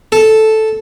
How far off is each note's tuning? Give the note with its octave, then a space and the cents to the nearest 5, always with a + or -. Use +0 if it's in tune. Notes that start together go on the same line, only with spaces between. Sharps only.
A4 -5